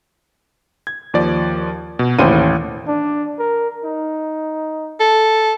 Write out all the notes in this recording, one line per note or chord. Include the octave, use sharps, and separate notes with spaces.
G#6
D#2 F3 D5
B2
A1 D#2 C5 D#7
D4
A#4
D#4
A4